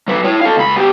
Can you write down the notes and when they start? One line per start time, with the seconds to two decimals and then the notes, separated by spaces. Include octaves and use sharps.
0.08 F#3 B4
0.24 E4 C#5
0.41 A4 F5
0.57 C#2 B5
0.76 B3 G4